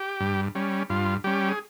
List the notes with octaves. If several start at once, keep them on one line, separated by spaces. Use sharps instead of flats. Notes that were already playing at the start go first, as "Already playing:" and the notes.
Already playing: G4
G2
G3 C#4
G2 F4
G3 C#4 G4
G#4